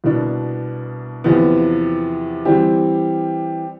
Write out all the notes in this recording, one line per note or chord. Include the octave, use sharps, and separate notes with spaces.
C2 B2 B3 D4
E2 C3 F3 B3
E3 G3 C4 G4